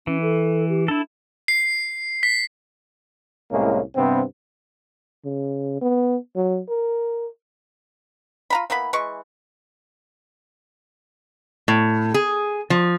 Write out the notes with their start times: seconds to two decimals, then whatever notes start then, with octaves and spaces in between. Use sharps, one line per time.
0.07 E3 C#4
0.22 A4
0.69 G4
0.88 D4 E4 A4
1.48 C7
2.23 B6
3.51 C2 A2 G#3 A#3 C#4
3.95 G2 C3 B3 C4
5.25 C#3
5.82 B3
6.36 F#3
6.69 A#4
8.50 F4 A#5 B5
8.70 E3 A#3 B3 B5
8.93 E3 G#3 C#6
11.68 A2
12.14 G#4
12.70 F3